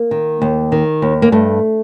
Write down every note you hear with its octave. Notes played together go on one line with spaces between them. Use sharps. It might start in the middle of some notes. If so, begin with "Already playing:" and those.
Already playing: A#3
D#3
D#2
D#3
D#2
A#3
G2 A3